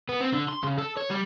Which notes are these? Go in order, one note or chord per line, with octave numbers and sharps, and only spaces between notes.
B3
C4
D3
C6
C#3
A4
C#5
G3